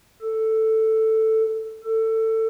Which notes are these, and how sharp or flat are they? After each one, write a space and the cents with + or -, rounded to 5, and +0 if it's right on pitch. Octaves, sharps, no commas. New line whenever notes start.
A4 +5
A4 +20